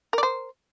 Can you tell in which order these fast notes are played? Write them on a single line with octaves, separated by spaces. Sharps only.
A#4 D5 C5